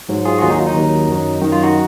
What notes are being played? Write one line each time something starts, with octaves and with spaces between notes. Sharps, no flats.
G#2 F#3
F4 G#4
F#4
D#2 D#3 F#3 F4 G#4
D#4 F#4
F4
D#4
D#2 D#3 F#3
F#2 D#3 F#3
F#2 D#3 F#3
F4
D#4 F#4